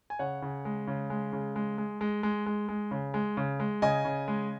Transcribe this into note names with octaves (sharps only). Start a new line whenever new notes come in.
G#5
C#3 C#5 F#5
C#3
G#3
C#3
G#3
C#3
G#3
G#3
G#3
G#3
G#3
G#3
C#3
G#3
C#3
G#3
C#3 D#5 G#5
C#3
G#3